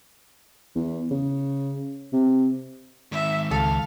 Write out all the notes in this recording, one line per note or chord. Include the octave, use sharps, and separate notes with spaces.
E2
C#3
C3
D#3 G#3 E5
C#2 A4 F5